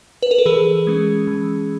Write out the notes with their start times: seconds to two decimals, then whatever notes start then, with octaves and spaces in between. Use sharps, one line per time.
0.23 B4
0.31 A#4
0.38 A4
0.46 E3 G#4
0.87 G#3 C#4
1.27 E3